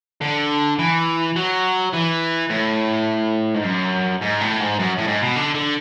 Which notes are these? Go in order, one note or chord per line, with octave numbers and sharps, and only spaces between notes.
D3
E3
F#3
E3
A2
G#2
F#2
G#2
A2
G#2
F#2
A2
G#2
B2
D3
D3